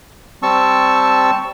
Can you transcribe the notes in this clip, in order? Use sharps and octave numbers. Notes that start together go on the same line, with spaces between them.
G3 C4 A5 C#6 E6